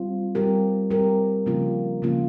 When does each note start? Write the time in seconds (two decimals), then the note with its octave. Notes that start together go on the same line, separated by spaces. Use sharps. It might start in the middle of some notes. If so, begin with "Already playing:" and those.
Already playing: G3 C4 F4
0.35 G3 C4 G4 A#4
0.91 G3 C4 G4 A#4
1.46 C#3 F3 A#3 C#4 F4
2.02 C#3 F3 A#3 C#4 F4